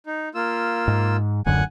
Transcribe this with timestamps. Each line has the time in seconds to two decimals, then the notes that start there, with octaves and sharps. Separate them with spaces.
0.06 D#4
0.35 A#3 F4 E6
0.88 G#2
1.46 D1 F#2 D3 F#5 G#5